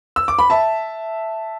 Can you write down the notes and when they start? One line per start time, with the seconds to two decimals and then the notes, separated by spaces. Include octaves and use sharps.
0.16 E6
0.28 D6
0.39 B5
0.50 E5 A5